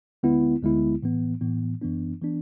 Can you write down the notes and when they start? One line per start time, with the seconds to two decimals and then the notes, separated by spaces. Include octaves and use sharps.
0.23 D2 D3 G#3 B3 E4
0.62 D2 D3 G#3 B3 E4
1.03 A2 E3 B3
1.41 A2 E3 B3
1.81 F#2 E3 B3 D4
2.22 E3 B3 D4